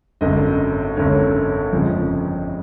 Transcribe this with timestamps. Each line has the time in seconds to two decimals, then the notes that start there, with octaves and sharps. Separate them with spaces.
0.21 G#1 F#2 D3 D#5
0.96 G#1 F#2 D3 C#5
1.72 G1 F2 C#3 F3 G#3